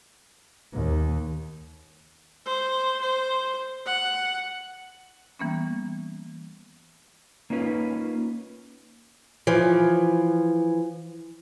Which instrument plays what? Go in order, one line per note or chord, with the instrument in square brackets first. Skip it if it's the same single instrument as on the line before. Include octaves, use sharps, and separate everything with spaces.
[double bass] D#2
[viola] C5
C5
F#5
[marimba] E3 G3 A#3 B3 C#4
[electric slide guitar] A#3 C#4 D#4 F4 B4
[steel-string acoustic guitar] E3 F3